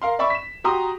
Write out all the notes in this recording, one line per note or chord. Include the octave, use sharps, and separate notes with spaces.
A#4 F5 C6
D5 E5 B5 C#6
B6 E7
F#4 G4 A#5 C6 D#6